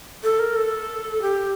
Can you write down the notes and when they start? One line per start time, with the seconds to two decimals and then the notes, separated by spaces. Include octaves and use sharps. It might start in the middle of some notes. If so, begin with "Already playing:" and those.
0.23 A4
0.39 A#4
0.56 A4
1.22 G4